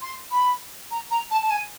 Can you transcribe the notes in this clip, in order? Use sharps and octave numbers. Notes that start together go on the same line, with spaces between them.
C6
B5
A#5
A#5
A5
A5
G#5